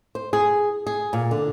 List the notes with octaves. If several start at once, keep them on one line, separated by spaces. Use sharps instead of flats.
C5
G#4
G#4
A#2
D3